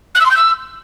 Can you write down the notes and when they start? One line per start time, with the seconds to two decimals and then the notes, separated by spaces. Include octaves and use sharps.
0.14 F#6
0.20 E6
0.25 C6
0.30 G6
0.36 E6